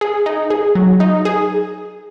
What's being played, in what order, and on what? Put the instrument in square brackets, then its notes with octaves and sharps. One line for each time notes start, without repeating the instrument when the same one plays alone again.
[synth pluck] G#4
D#4
G#4
F#3
D#4
G#4